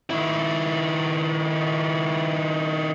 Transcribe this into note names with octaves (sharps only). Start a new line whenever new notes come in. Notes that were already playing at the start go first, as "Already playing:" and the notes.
D#3 E4